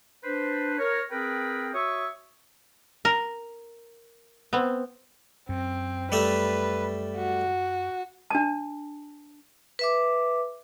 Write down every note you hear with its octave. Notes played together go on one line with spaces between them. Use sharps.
D4 B4 C5
A#4 C#5
C4 G#4 A#4 B4 G5
F#4 C#5 E5 C#6 D#6 E6
A#4
B3 C4
F#2 C4
G3 A3 B4 E5
F#4
D4 A5
B4 E5 D6